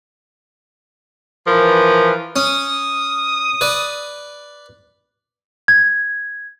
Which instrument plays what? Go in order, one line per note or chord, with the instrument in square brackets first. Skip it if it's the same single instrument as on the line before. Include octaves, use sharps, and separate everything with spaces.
[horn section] E3 F3 A#4 B4
[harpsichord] C#4 [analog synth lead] D#6
[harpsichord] B4 D5
[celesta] G#6